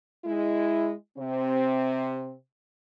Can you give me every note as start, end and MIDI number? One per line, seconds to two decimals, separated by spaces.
0.25 0.93 56
0.25 0.93 64
1.18 2.35 48
1.18 2.35 60